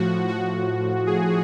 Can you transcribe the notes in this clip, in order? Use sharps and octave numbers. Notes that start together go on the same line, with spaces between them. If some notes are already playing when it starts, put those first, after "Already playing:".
Already playing: A2 F3 F#4
F#4
G#4